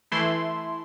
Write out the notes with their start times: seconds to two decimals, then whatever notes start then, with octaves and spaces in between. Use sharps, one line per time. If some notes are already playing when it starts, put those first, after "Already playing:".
0.12 E3 A3 E4 C6